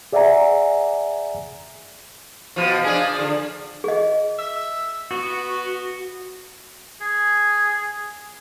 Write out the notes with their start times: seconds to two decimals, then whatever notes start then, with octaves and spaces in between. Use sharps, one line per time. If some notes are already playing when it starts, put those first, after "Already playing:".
0.13 G#4 D5 E5 F#5 G#5 A#5
2.56 B2 F3
2.84 F3 D4 G#4
3.19 D3
3.84 G#4 D#5
4.39 E5
5.11 B3 F#4
7.01 G#4